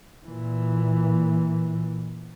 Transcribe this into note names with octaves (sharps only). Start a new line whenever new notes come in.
A#2 E3